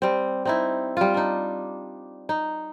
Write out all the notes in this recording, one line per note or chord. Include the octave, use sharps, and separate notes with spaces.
G3 C4
C4 D#4 E4
G3 F4
D4 D#4
D#4